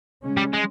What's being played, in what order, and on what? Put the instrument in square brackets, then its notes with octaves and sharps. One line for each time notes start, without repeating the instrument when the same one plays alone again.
[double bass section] C#3 G#3 C#4
[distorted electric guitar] G3
G#3